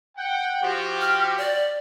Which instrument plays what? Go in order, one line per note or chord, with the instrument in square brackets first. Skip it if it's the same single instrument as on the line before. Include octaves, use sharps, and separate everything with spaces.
[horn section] F#5 G5
F3 F#4 G4
[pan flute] F6
D5